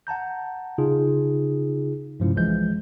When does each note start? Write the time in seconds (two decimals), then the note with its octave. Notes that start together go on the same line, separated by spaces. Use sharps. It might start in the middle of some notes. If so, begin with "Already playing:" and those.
0.07 F#5 A5 A#5 G6
0.78 C#3 D#4 F4 G#4
2.20 G2 C3 F3 G#3 C#4 E4
2.36 B1 E3 F3 G#3 G6